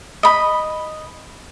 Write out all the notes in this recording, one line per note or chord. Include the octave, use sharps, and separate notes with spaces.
D#5 B5